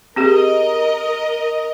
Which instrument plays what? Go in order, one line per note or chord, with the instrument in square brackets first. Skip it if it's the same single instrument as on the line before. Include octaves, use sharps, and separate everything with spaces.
[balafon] C4 G4 G#4 [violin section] A#4 D#5